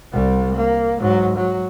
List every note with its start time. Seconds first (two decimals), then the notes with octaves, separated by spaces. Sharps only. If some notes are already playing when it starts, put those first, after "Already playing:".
0.12 C2 G3
0.55 A#3
0.99 G#2 F#3
1.37 F#3